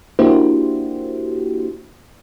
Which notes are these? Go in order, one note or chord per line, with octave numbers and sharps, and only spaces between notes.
A#3 D4 E4 F#4 G4 C5